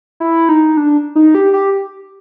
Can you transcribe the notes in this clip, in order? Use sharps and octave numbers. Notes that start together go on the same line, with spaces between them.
E4
D#4
D4
D#4
G4
G4